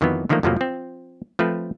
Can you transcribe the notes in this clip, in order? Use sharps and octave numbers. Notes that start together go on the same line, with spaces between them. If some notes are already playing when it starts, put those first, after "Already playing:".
F2 D#3 E3 F#3 B3
D3 D#3 F3 A3 A#3
F2 A2 C3 F3 F#3 A#3
F3 C4
F3 A3 C4 B4